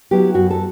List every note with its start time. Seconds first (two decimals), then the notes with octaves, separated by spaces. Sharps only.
0.11 F#3 B3 E4 G4
0.34 F#2 F#4
0.50 A4